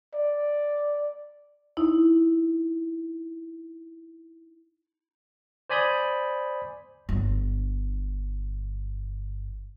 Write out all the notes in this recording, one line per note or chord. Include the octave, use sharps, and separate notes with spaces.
D5
D#4 E4
C5 D5 G#5 B5 D#6 G6
G1 D4